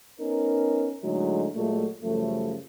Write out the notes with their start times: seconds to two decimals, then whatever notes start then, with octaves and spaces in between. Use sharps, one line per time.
0.20 B3 C#4 D#4 A#4
1.03 A2 D3 F#3 G#3 A3 D#4
1.55 A#2 F#3 G#3 A3
2.03 F#2 C#3 F3 G3 A3